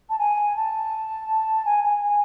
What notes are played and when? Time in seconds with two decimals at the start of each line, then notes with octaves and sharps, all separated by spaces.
0.10 A5
0.19 G#5
0.56 A5
1.65 G#5
1.84 G#5
2.02 G#5